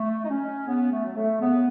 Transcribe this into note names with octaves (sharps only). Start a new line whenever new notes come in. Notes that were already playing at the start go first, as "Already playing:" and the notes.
Already playing: A3
D#4
F#3 C#4
C#3 B3
A3
F#3
A3
C#3 B3